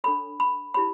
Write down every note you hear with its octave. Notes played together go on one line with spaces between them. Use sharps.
D4 A4 C#5 B5
B5
E4 G4 C#5 B5